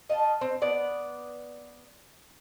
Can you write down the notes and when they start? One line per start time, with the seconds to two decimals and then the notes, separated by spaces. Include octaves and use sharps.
0.10 D#5 F5 A5
0.41 C4
0.61 B3 D5 F#5